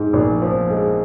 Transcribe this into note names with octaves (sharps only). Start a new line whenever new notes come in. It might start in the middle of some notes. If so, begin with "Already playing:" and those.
Already playing: G#2 G#3
A#1
F3
G#3